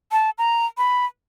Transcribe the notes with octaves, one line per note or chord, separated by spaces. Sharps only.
A5
A#5
B5